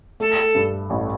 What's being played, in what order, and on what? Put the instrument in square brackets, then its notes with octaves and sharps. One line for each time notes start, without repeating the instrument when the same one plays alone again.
[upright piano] A3 [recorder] A4
[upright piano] G2
A1